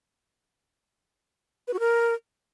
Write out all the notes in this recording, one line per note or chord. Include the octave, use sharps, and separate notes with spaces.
B4
F#4
A#4